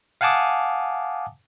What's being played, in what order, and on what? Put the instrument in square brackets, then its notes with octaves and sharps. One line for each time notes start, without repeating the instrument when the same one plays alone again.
[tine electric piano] F5 F#5 G#5 A5 D6 D#6